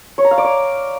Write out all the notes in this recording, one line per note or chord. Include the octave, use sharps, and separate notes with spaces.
C#5
A#5
F5
D5
D6